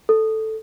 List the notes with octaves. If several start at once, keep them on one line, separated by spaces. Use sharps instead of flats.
A4